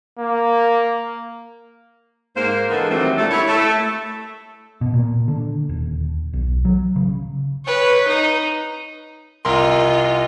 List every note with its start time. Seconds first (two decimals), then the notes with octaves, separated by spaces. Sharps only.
0.19 A#3
2.35 G#2 A#3 C5
2.70 D3 E3 G#3 B3 A4 A#4
2.91 D#3 E3 F#3 G3 A3 C4
3.18 A#2 D3 G3 A3
3.31 E4 C#5
3.48 A3
4.81 B2
4.93 A#2
5.28 D3
5.69 D#1
6.33 B1
6.65 F#3
6.96 C#3
7.65 B4 C#5
8.07 D#4
9.45 C2 F4 A#4 D#5 C6